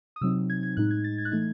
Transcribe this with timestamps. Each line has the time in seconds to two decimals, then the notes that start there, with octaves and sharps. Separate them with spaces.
0.16 D#6
0.21 C3 F#3 C4 D#4 E6
0.50 G#6
0.63 G#6
0.77 A2 G#3 D#4 F#6
0.91 G#6
1.04 A6
1.18 G#6
1.25 F#6
1.32 E3 A3 D#4 G#6